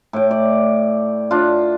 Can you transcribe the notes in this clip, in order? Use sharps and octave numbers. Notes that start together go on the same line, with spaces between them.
A2 G5
D5
D4 F4